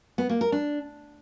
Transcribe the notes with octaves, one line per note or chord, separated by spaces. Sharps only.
B3
A#3
A#4
D4